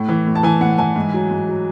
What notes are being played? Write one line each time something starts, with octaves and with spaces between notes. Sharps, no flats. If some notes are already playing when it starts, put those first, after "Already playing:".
Already playing: A2
E3
A2
A5
E3 G#5
A2 F#5
E3 G#5
G#2
F#3
G#2
F#3